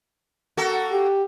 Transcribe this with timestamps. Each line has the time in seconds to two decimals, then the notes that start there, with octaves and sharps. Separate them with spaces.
0.57 A#3 F#4 A4
0.92 G4